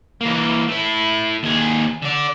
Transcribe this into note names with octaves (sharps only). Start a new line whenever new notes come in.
E3 A#3
A3 E4
D#2 G#4
D3 D5